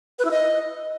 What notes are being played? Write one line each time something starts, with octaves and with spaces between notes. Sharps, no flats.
B4
E4
D#5